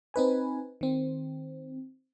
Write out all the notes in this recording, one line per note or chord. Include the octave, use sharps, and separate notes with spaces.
C4 D#4 B4 G#5
D#3 C4